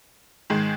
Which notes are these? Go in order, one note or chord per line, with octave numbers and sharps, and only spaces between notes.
G#2 D#3 G#3